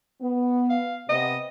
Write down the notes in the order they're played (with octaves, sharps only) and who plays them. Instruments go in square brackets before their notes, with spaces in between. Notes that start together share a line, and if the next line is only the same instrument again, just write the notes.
[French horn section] B3
[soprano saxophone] F5
[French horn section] C3 B3 [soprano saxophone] D#5